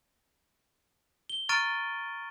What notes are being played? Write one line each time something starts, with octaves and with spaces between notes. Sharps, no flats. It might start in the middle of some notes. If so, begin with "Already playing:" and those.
G7
A#5 C#6 F6 A6 D7 D#7